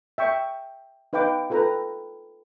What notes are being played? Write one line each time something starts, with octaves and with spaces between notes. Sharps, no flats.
E5 G5 C#6
D#4 B4 F5 G5 D6
F4 A4 B4 G5 A#5